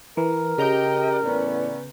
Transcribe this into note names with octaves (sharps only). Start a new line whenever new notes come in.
E3 A#4
C#3 G4 D#5 G5 A#5 G6
A2 E3 B3 C#4 D5